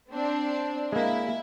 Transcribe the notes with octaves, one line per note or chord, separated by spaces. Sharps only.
C4 D4
G#3 A#3 E4